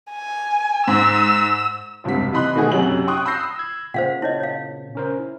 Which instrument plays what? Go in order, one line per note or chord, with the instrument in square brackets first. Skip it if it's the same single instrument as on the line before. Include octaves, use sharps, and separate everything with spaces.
[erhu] G#5
[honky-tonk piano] G#2 [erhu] E6
[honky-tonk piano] F1 C#2 G2 C3 F#4 B6
C3 E3 D#5 B5 C6 F#6
B2 D#3 A3 F#4 G#4
F#2 C3 F#3 G4 F#7
G5 C6 C#6 D#6 F#6
B5 D#6 E6 G6 A#6 C7
[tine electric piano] E6 G#6
[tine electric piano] A#2 C#3 [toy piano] C5 F5 F#5
[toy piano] E4 C#5 D#5
C#5 F5
[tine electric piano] C#4 A#4 C5
E4